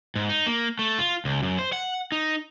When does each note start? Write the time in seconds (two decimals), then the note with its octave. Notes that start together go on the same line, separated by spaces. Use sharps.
0.16 G#2
0.29 D#4
0.46 A#3
0.79 A3
0.99 F4
1.25 C#2
1.43 F#2
1.59 C5
1.73 F#5
2.12 D#4